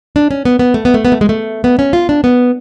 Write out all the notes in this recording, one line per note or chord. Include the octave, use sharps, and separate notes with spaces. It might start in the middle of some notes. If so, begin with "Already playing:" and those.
D4
C#4
B3
B3
A3
B3
A3
B3
A3
G#3
A3
B3
C#4
F4
D4
B3